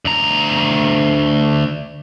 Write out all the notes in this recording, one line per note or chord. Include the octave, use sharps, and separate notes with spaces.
D2 A#5